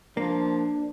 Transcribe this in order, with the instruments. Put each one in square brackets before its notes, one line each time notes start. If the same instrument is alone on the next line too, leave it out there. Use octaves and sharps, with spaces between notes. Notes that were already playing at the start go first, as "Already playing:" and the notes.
[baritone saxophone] F3 [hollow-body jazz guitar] A#3 [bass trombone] D4